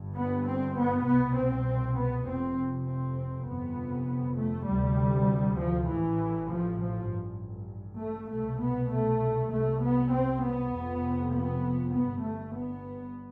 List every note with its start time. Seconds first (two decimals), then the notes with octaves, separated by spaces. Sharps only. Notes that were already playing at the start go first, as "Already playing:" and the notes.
Already playing: G1 G2
0.15 B3
0.45 C4
0.76 B3
1.05 C2 B2 B3
1.36 C4
1.96 B3
2.26 F1 F2 C3 C4
2.87 C4
3.48 G1 F2 C3 B3
4.38 A3
4.68 D2 C3 G3
5.58 F3
5.89 A1 A2 E3
6.50 F3
6.80 F3
7.10 A1 G2
8.00 A3
8.31 C2 B2 A3
8.61 B3
8.91 A3
9.51 C2 C3 A3
9.82 B3
10.13 C4
10.43 B3
10.73 F1 F2 C3
11.33 B3
11.93 G1 B3
11.99 G2
12.24 A3
12.55 B3